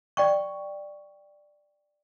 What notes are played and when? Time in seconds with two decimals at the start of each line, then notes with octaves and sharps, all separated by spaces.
0.17 D5 G5 C#6